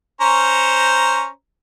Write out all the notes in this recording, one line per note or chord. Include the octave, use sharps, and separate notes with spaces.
C#4 C5 A#5